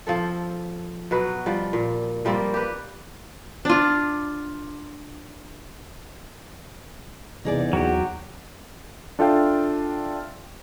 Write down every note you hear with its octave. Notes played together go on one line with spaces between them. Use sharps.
F3 C4 A4
B2 F#3 B4
F3 G3
A#2
F3 G3 A#3 C4
G4 B4
D4 F4
E2 C3 D#4 G#4 D5
D#2 F#3 F#4 G4
D4 F4 A4 E5 F5 G5